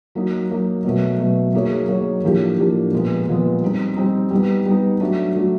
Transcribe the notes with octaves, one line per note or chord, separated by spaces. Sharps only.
F#3 A#3 D#4
F#3 A#3 D#4
B2 F#3 A3
B2 F#3 A3
F#3 A#3 D#4 G#4 C#5
F#3 A#3 D#4 G#4 C#5
A2 F3 A#3 D4 G4
A2 F3 A#3 D4 G4
A#2 F3 G#3 B3
A#2 F3 G#3 B3
G3 C4 D#4
G3 C4 D#4
G3 B3 D#4
G3 B3 D#4
F#3 A3 D4 F#4
F#3 A3 D4 F#4